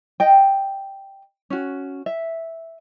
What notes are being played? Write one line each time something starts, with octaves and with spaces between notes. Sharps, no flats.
D#5 G5
C#4 F#4
E5